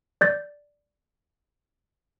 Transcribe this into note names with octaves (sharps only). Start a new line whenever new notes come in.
D5 G6 A6